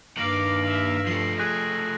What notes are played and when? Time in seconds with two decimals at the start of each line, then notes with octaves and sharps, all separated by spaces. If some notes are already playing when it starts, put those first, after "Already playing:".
0.17 G2 D#3 A#3 F5 D6 A#6 D7 F#7
0.63 E5 F5
1.07 F3 A3 C7
1.38 G#4 F#6 A#6